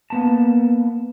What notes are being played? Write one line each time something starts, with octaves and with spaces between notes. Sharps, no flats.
A#3 B3 A5